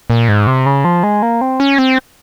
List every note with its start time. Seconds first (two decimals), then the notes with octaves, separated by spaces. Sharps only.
0.10 A#2
0.28 G#2
0.47 C3
0.66 C#3
0.85 F3
1.03 G#3
1.22 A#3
1.41 C4
1.60 C#4
1.78 C4